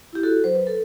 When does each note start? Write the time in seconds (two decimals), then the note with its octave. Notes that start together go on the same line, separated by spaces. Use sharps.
0.13 E4 G4
0.23 F#4 A4
0.44 F#3 C5
0.55 B4
0.67 A4